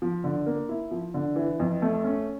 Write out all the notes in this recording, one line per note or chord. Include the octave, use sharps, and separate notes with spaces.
F3
D3
A#3
E4
F3
D3
E3
F2
A3
C#4